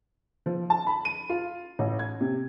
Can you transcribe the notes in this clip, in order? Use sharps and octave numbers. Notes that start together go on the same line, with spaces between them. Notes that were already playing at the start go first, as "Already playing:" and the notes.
F3
A5
B5
D#7
F4
A1
G#6
C3